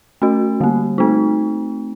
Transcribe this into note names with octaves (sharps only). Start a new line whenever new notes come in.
A3 C#4 F#4
D3 G3 A#3
A3 C4 D#4